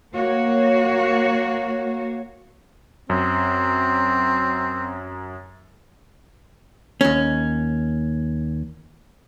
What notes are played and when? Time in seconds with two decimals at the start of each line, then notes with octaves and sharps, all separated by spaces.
0.15 A#3 F#4 C#5
3.10 F#2 C4
7.01 D#2 C#4